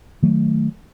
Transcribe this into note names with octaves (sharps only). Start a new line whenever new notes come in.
D#3 F#3 A3